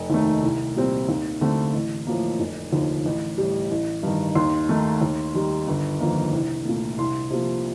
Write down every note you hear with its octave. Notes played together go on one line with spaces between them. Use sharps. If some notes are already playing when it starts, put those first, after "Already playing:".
Already playing: F1
D#2 D#3 A3
C2
A#2 G3 C4
D#2
D3 A3 C4
A1
A2 F3 A#3
F1
D#2 D3 F3
A1
A2 G3
A1
G2 D#3
D#2 C6
D#3 A3
D#2
D#3 G3
G1
F2 D#3 A#3
C2
A#2 A3
C2 C6
C3 F3 A#3